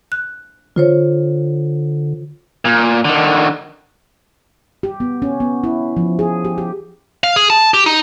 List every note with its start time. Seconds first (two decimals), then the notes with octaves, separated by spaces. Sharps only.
0.12 F#6
0.76 D3 F4 C5 C#5
2.65 A#2
3.05 D3 D#3
4.83 G4
5.00 B3
5.22 C#4
5.40 B3
5.64 E4
5.97 F3
6.19 G#4
6.45 G4
6.58 G4
7.24 F5
7.36 G#4
7.50 A5
7.74 G4
7.86 D#4